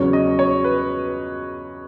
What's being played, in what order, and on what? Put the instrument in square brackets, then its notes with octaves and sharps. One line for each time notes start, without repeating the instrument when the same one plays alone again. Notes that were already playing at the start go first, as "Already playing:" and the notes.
Already playing: [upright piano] E2 C#3 F#3 B3 [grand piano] C#5
[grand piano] D#5
C#5
B4